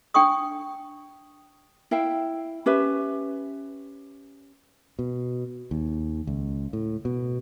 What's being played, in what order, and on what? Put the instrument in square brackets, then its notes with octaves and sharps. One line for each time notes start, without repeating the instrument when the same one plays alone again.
[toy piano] D4 G5 G#5 C#6 D#6
[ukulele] E4 E5 F5 G5
C#4 G4 B4 E5
[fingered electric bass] B2
D#2
C#2
A2
B2